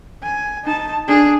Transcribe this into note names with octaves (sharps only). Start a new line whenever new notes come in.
G#5
D#4 A5
D4 G#4